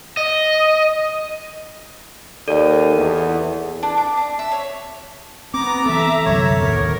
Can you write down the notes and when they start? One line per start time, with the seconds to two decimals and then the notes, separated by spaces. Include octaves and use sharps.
0.17 D#5
2.48 D#2 A4 D5 D#7
2.96 E2
3.83 D4
3.98 D6
4.17 D4
4.39 E5
4.52 C#5
5.54 B3 C4 A#5 D6
5.86 E3 B3 A4 E5 A#5
6.26 C2 F#2 D3 C#5
6.61 D1 D#2 B3 A#4